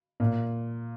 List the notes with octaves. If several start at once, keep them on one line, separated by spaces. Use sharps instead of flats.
A#2